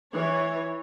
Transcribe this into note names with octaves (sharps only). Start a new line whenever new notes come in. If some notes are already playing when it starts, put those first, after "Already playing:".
E3 C#5